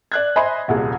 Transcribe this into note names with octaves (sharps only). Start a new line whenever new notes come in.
D5 F#6 G#6
C5 D#5 E5 G#5 B5 C6
D#1 C2 A#2 G#4